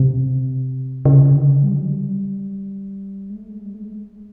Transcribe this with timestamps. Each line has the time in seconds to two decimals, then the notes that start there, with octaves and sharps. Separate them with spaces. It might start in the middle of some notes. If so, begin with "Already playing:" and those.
Already playing: C3
1.05 C#3
1.35 D3
1.63 G3
1.75 F#3
1.87 G3
3.30 G#3
3.36 A3
3.51 G#3
3.65 G3
3.75 A3
3.79 G#3
3.88 A3
3.94 G#3